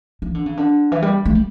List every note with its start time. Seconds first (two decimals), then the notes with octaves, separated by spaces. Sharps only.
0.22 E3
0.35 D3
0.46 C#3
0.57 D3
0.92 E3
1.02 G3
1.25 A3
1.35 G3